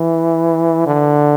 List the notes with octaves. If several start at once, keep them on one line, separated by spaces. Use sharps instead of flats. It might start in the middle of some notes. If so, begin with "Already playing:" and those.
Already playing: E3
D3